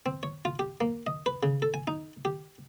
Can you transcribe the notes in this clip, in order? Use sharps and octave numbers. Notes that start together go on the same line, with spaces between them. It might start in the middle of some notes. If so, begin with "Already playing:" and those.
C4
C#5
F4
G4
A#3
D#5
B4
C#3
A4
G#5
D#4
G4